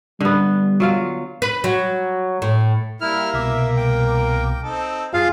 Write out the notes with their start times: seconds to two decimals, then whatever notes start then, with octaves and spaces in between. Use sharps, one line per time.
0.20 D3 G3 B3
0.80 F#3 F4 F5
1.42 B4
1.64 F#3
2.42 A2
3.01 G3 A#3 E4 A#4 F6
3.33 C2 B2 E5 D6
3.76 G5
4.63 C4 D#4 A4
5.14 F#2 F4 G#4 F5